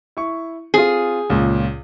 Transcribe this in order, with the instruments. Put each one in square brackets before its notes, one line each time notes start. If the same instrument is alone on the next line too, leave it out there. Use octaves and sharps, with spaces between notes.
[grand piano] E4 C#6
[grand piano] C4 F4 [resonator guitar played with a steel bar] G#4
[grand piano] C#2 A#2